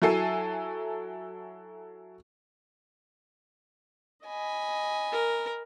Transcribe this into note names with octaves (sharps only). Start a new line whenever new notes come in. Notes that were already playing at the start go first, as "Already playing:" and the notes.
F#3 E4 A4 G#5 C7
D#5 G#5 B5
A#4